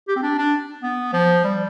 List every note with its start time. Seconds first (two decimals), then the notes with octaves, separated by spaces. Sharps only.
0.08 G4
0.16 C4
0.23 D4
0.38 D4
0.83 B3
1.13 F3
1.44 G3